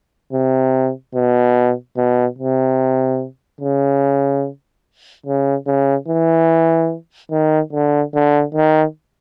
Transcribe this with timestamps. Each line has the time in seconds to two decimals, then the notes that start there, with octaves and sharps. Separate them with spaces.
0.33 C3
1.15 B2
1.97 B2
2.38 C3
3.61 C#3
5.26 C#3
5.67 C#3
6.08 E3
7.31 D#3
7.73 D3
8.14 D3
8.54 D#3